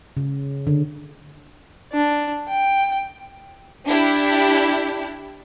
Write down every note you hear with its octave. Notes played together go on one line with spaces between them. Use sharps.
C#3
D3
D4
G5
D4 E4 G4